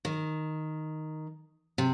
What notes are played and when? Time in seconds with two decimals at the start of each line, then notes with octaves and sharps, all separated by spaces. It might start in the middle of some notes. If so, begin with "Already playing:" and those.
0.05 D#3
1.78 C3